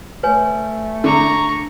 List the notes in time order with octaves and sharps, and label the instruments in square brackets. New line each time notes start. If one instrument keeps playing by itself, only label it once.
[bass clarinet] A3 [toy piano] B4 C#5 G#5
[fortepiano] D3 [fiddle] A#5 C#6